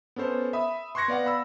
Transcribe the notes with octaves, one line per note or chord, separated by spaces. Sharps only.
B3 C#4 A4 C5
E5 B5 D#6
C6 C#6 F#6 G#6 A#6 C#7
B3 D5 F5 F#5
B5 E6